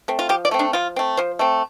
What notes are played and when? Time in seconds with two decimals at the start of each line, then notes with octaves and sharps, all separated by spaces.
0.08 A3 C4
0.19 F4
0.29 F3 G4
0.45 D5
0.51 A3 C4
0.59 D4
0.73 F3 F4
0.96 A3 C4
1.17 F3 C5
1.39 A3 C4